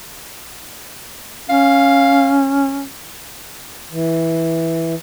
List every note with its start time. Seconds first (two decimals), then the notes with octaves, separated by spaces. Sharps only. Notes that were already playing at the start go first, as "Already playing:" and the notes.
1.49 C#4 F5
3.92 E3